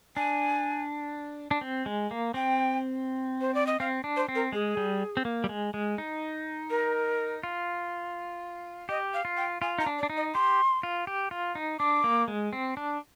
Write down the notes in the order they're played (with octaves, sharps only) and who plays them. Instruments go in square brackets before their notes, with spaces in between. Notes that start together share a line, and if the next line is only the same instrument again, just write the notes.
[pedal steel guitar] D4 [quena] G#5
[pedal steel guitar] D4
C4
G#3
A#3
[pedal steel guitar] C4 [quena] G5
[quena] C5
D5
D#5
[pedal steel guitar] C4 [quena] F5
[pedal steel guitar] D4
[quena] C5
[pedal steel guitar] C4
[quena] A#4
[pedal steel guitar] G#3 [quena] G#4
[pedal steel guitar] G3
C4
A#3
G3
G#3
G#3
D#4
[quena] A#4
[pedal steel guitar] F4
[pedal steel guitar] G4 [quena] D#5
[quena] F5
[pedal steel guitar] F4
[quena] G5
[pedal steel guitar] F4 [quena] G#5
[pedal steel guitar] D#4 [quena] A#5
[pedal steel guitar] D4
[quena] D5
[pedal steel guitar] D4
D#4
[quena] D#5
[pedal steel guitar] G4 [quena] C6
[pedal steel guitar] F4
G4
F4
D#4
[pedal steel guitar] D4 [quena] D6
[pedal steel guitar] A#3
G#3
C4
D4